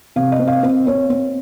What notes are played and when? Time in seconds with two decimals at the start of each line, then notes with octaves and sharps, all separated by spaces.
0.16 C3 F5
0.32 D#5
0.39 C4
0.47 F5
0.63 C4
0.87 C4 C#5
1.10 C4